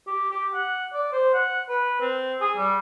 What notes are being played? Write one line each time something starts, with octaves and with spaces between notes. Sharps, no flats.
G4
G4
F#5
D5
C5
F#5
B4
C4
G#4
G3